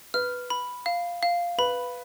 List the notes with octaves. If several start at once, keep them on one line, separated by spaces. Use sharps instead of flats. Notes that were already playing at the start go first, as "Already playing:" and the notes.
B4 F6
B5
F5
F5
B4 B5